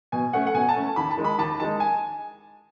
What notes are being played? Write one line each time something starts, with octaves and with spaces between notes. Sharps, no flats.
B2 G#5
A3 C#4 F#5
F#5
B2 G#5
A5
A3 C#4
D#2 B5
A5
D#3 G#3 D#4
B5
D#2 A5
D#3 G#3 D#4 A5
G#5